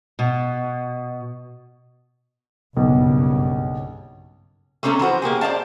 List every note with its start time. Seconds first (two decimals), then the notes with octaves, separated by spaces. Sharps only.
0.19 B2
2.77 F#1 B1 G2 C#3
4.83 A3 A#3 C4 C#4 A4 A#4
4.99 E3 F3 F#4 C5
5.22 B2 A#3 G4 G#4
5.41 C5 D5 D#5 F5 A5